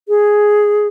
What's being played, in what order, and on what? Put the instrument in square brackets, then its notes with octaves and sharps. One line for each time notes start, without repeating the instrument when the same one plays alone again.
[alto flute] G#4